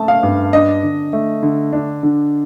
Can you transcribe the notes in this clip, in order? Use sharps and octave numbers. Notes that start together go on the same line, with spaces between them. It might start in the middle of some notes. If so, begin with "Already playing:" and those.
Already playing: A3 A5
F5
G2
D4 D#5
D3
A3
D3
D4
D3